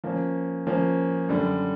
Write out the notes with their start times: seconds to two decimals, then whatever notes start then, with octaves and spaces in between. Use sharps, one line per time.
0.04 F3 A#3 C#4
0.67 F3 A#3 C#4
1.29 F#2 D3 G3